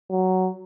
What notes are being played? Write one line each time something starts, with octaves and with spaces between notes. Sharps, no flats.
F#3